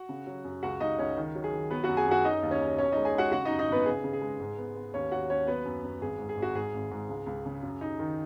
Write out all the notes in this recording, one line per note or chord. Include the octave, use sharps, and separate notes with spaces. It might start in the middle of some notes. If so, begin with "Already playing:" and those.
Already playing: F#4 F#5
C#3
F#3
F#2
C#2 F#4 F#5
C#2 D#4 D#5
C#2 C#4 C#5
D#3
F#3
G#4
D#3
F#3 B3 B4
F#2 F#4 F#5
G#4 G#5
F#2 F#4 F#5
F#3 D#4 D#5
D#2
C#4 C#5
D#2
B1 C#4 C#5
D#4 D#5
G#3
G#4 G#5
G#3 F#4 F#5
C#3 F#4 F#5
F#2 D#4 D#5
D#4 D#5
G#1 B3 B4
C#3 G#4
C#3
G#4
G#3
G#2
B3
B3
D#2 C#4 C#5
D#2 F#4 F#5
D#2 C#4 C#5
F#3 B3 B4
F#2
F#2
G#1 G#4
G#2
G#4
G#1
F#4
G#2 G#4
G#1
G#2
C#2
C#2
C#3
F#2
D#4
D#3